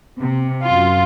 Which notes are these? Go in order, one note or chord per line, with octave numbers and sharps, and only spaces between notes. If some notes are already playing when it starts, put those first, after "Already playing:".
C3
F#2 F4